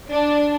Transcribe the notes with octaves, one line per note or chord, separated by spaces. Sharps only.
D4